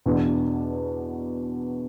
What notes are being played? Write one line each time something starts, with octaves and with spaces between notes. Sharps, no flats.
E2 B2 B3 D4